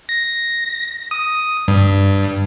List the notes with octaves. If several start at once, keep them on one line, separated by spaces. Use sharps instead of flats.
A#6
D#6
G2